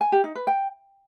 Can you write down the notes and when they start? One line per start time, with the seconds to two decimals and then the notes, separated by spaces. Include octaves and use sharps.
0.01 G#5
0.12 G4
0.24 D#4
0.35 B4
0.47 G5